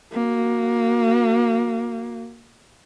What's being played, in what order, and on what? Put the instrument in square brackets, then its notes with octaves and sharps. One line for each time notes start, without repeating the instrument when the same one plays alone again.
[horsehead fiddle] A#3 F#4